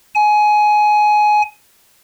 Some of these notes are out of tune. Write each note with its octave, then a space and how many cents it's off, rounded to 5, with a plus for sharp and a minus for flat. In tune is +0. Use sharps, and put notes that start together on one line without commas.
G#5 +20